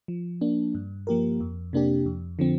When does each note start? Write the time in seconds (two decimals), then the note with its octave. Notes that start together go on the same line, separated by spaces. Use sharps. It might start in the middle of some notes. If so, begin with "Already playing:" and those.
0.08 F3
0.41 A#3 D4
0.75 G2
1.07 F3 A#3 G4 A#4
1.40 F2
1.73 C3 A#3 D4 G4
2.06 F2
2.39 D3 F3 C4